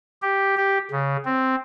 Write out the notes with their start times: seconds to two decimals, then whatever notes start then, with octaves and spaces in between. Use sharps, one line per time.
0.22 G4
0.57 G4
0.91 C#3
1.25 C4